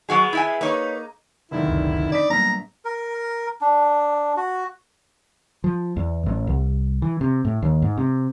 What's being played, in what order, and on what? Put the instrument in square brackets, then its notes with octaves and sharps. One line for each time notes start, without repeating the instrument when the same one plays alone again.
[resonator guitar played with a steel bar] F#3 F#4 G#4 [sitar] G#3 B3
[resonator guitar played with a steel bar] E4 E5 G#5
[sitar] A#3 D#4 [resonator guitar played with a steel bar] B4 C#5
[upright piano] F1 D3 D#3 [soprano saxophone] E4
[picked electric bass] F#1 C#2
[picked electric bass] D4 [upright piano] D#4 B5 B6 [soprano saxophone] D5
[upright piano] A#1 B6 [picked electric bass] F#3 G3 B3 [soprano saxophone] A#5
[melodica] A#4
D4
F#4
[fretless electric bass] F3
E2
A1
C2
E3
C3
A2
D#2
G#2
C3